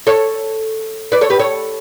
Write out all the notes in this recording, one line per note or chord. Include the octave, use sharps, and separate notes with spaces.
A4 C#5
B4 D5
A4 C#5
G4 B4
A4 C#5